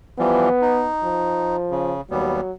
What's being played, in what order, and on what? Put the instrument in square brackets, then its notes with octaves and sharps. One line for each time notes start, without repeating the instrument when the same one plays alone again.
[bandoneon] E3 F3 G3 [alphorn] B3
[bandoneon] D#4
[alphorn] F3
[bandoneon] C#3
[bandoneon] D#2 G3 B3 [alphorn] F#3